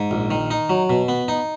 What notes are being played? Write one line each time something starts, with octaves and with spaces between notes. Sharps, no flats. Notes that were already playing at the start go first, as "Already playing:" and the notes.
Already playing: G#2
A#1
D#3
D#4
F#3
B2
B3
D#4